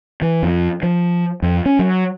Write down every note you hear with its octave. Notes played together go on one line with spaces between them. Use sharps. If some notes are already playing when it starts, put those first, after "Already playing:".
E3
F2
F3
F2
C#4
F#3